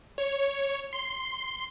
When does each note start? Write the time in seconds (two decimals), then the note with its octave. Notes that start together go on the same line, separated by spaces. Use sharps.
0.18 C#5
0.93 C6